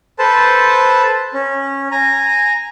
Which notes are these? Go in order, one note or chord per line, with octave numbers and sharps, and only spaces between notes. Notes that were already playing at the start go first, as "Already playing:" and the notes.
A4 B4 C5 A5
C#4
G#5 A#5